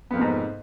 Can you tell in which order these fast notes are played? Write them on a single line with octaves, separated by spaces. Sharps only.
B3 F2 A#3 C3 G#2